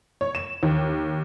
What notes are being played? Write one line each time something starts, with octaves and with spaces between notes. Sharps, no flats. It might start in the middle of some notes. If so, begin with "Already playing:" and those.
C#5
E7
D#2